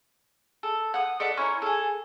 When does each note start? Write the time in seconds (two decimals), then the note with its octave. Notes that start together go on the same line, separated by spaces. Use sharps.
0.63 A4
0.94 F#5 D#6
1.20 A4 D5 E5 F#5
1.37 C#4 E4 A#4
1.62 G#4 A4